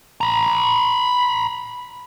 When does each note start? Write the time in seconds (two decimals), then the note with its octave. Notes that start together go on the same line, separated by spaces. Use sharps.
0.21 A#5 B5